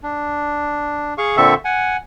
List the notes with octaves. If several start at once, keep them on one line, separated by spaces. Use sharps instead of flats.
D4
G#4 F5 C#6
A#2 D3 C4 A4 E5 C#6
F#5 G#5